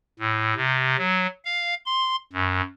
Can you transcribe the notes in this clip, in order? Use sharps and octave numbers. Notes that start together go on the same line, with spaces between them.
A2
C3
F#3
F5
C6
F#2